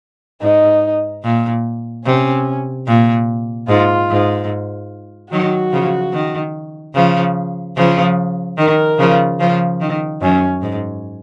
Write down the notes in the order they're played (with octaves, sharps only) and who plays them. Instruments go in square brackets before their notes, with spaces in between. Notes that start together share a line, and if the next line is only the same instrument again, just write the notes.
[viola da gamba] G#2 [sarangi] D#4
[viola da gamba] A#2
[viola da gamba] C3 [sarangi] C#4
[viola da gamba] A#2
[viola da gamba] G#2 [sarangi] F4
[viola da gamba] G#2
[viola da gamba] D#3 F#3 [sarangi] F#4
[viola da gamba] C#3 F3
D#3
C#3 F3
C#3 F3
[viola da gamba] D#3 [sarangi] A#4
[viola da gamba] C#3 F3
C#3 F3
D#3
[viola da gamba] F#2 [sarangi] C#4
[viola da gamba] G#2